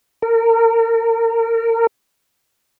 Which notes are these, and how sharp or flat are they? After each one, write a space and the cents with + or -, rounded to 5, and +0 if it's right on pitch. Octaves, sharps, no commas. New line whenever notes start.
A#4 -30